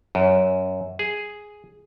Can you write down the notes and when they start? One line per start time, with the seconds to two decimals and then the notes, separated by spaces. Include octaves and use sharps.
0.15 F#2
0.99 G#4